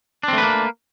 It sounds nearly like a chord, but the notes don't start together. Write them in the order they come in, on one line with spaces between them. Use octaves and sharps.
D4 C4 A3 B4 A#3